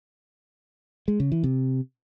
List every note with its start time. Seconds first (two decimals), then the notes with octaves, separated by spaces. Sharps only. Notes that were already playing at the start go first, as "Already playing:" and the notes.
1.08 G#3
1.20 C#3
1.32 E3
1.44 C3